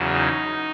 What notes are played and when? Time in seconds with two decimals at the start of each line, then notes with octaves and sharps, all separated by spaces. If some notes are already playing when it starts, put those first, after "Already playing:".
Already playing: E2 C#3 F#3
0.13 D#4